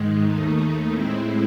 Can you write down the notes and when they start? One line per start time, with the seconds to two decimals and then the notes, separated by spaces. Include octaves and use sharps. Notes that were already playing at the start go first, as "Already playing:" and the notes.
Already playing: G#2 D#3 G#3
0.25 D#2 D#3 A3 D#4
0.90 A2 G#3 C4 E4